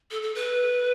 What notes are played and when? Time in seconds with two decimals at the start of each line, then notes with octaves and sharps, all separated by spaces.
0.11 A4
0.22 A4
0.35 B4